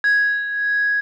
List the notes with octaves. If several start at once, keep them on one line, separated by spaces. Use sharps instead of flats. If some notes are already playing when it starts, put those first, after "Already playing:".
G#6